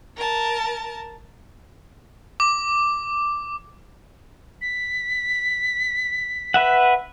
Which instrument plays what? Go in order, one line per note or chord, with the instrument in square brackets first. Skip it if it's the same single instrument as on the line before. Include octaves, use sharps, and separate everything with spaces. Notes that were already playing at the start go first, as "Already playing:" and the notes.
[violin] A#4 A5
[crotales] D6
[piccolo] B6
[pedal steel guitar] B4 E5 F#5